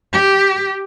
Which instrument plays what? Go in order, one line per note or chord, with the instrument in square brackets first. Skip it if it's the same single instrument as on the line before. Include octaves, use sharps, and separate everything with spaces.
[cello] G4